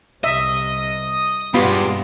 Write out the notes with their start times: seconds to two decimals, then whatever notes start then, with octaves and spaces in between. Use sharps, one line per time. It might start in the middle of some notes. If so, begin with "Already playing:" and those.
0.24 C2 C3 D#5 E5
1.54 E2 G2 B2 G#3 B3 F4 G4 B5